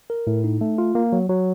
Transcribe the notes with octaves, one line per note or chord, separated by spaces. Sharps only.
A#4
A2
D#4
A3
F4
A#3
F#3
F#3